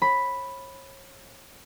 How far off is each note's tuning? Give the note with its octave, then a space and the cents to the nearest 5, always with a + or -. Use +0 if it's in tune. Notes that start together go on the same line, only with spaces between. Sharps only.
C#5 -35 B5 +0